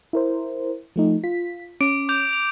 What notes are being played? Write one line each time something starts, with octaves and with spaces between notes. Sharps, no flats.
E4 A#4 C5
F3 A3 D#4
F4 B6
C#4 D6 D7
D6 G6 F7
F7